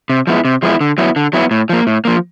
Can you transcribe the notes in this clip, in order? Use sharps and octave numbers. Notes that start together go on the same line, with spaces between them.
C3
F3 G#3 B3 E4
C3
F3 G#3 B3 E4
D3
F#3 B3 E4
D3
F#3 B3 E4
A2
F3 A#3
A2
F3 A#3